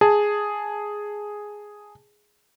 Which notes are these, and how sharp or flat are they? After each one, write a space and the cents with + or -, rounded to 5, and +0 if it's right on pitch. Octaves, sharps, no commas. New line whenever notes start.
G#4 +0 A5 +0